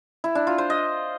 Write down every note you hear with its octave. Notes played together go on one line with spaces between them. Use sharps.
E4
D4
F4
C5
D#5